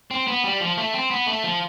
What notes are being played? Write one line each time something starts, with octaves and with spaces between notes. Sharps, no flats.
C4
B3
G3
F3
A3
C4
B3
A3
F3